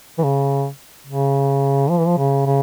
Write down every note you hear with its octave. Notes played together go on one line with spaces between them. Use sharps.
E3
C#3
C#3
F3
E3
F3
C#3
C#3